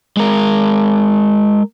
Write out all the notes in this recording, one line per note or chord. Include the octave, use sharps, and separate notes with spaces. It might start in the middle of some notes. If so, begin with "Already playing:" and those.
G#3 A#4